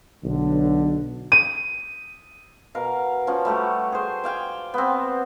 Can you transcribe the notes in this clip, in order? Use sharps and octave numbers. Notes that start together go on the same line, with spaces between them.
B1 D3
D#7
B2 A#4 F5
F3 C#4
G3 A3 F#4 G4
G#4 C5
D5 F5 G5 G#5
B3 C4